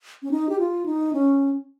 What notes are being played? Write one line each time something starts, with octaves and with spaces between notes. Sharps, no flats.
C#4
D#4
G4
F4
D#4
C#4